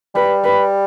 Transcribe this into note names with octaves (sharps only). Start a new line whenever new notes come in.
G3 B4
B4